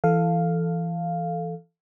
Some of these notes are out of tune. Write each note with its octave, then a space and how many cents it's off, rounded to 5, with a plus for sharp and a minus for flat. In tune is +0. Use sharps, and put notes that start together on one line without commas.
E3 +20 A4 +0 F5 +0